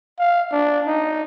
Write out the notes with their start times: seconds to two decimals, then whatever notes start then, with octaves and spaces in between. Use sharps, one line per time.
0.19 F5
0.52 D4
0.87 D#4